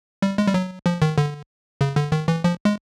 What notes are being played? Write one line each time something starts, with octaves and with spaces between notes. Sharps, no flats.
G3
G#3
G3
F#3
F3
D#3
D3
C#3
D3
D#3
E3
F3
G#3